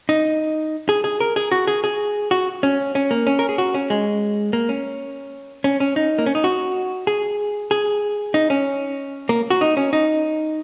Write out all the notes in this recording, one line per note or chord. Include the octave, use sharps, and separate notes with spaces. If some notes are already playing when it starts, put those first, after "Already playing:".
D#4
G#4
G#4
A#4
G#4
F#4
G#4
G#4
F#4
C#4
C#4
A#3
C#4
A#4
G#4
F#4
C#4
G#3
A#3
C#4
C#4
C#4
D#4
A#3
C#4
D#4
F#4
G#4
G#4
D#4
C#4
A#3
F#4
D#4
C#4
D#4